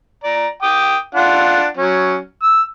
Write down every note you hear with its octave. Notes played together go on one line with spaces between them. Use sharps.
D5 A#5
G5 D6 D#6
D4 F4 F#5
F#3 C#4
E6